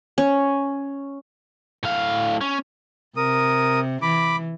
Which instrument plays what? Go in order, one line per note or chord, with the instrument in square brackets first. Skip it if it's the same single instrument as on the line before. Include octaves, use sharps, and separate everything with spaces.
[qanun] C#4
[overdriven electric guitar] A2 F5
C#4
[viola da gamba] C3 [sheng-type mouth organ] A#4 D#6
[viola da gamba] E3 [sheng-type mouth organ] B5 D6